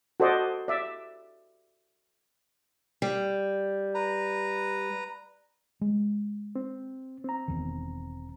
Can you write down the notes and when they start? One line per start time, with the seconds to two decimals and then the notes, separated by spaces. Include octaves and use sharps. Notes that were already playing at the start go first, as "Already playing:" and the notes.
0.20 F#4 A4 C5 D5 D#5
0.68 D5 E5
3.02 G3
3.95 B4 A#5
5.81 G#3
6.56 C4
7.24 C4 A#5
7.48 E1 E2 D#3